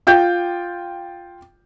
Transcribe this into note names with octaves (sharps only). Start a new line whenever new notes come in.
F4 G5 G6